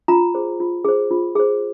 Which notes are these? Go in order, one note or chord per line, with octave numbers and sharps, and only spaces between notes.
F4 A#5
G#4 C5
F4
G#4 C5
F4
G#4 C5